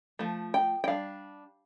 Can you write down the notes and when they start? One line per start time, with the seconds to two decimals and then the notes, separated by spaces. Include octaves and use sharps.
0.19 F3 A3
0.54 G5
0.84 G5
0.88 G3 D4 F5